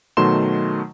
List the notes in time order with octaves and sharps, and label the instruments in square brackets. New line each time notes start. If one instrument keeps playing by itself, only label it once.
[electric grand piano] B2 D#3 F#3 A3 C6 E7